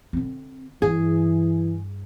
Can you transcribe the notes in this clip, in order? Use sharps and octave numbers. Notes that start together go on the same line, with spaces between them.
D3 C4
G2 E3 G#4